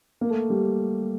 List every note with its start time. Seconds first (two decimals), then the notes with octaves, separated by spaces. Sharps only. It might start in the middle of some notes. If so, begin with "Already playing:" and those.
0.21 A#3
0.30 A3
0.50 G3